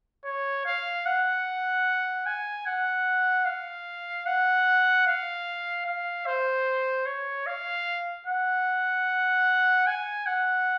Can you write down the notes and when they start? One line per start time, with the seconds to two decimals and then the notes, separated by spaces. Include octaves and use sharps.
0.25 C#5
0.65 F5
1.06 F#5
2.26 G#5
2.66 F#5
3.45 F5
4.26 F#5
5.06 F5
5.86 F5
6.26 C5
7.06 C#5
7.46 F5
8.26 F#5
9.87 G#5
10.26 F#5